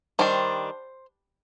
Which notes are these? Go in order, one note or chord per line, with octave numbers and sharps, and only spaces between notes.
D#3 G3 D4 C5